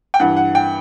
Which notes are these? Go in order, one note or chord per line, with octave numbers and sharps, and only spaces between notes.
G5
G2 E3 F#5
F#5
G5